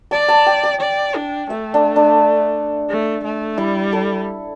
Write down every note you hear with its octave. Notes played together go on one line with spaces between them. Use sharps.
D5 A5
A5
G5
A5
D5
D4
A3 E5
D4
D4
A3
A3
G3 E4
A4